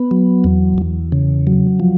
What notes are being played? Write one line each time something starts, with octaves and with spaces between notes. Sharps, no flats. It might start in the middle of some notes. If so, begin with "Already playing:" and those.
Already playing: B3
F#3
E2
E2
C#3
F#3
F3